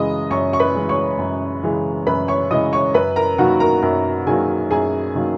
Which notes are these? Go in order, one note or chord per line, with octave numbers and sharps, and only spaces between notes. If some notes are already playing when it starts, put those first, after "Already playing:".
Already playing: F#2 C#3 E3 G#3 D#5 B5 D#6
F#2 C#5 C#6
C#6
B4 B5
C#3 E3 G#3
C#5 C#6
F#2
C#3 E3 G#3
F#2 B4 B5
C#5 C#6
C#3 E3 G#3 D#5 D#6
C#5 C#6
F#2 B4 B5
A#4 A#5
D#3 F#3 A#3 F#4 F#5
A#4 A#5
F#2 A#4 A#5
D#3 F#3 A#3 G#4 G#5
F#2 G#4 G#5
D#3 F#3 A#3